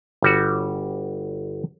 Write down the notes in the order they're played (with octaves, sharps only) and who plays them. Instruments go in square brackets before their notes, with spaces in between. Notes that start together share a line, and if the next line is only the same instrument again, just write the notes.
[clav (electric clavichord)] G1 G3 F#4